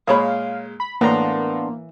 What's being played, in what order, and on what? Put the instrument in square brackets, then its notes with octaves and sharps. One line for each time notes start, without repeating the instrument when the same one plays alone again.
[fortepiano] A#2 G#3 [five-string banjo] G#4 C#5 B5 [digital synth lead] F5
[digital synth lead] B5
[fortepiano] A2 A#5 [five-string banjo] E3 [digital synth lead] A#3 [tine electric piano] B3 D4 C6